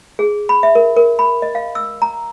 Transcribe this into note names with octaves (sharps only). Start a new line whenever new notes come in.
G#4
B5
E5
A#4
A#4
B5
D#5
F5
E6
A#5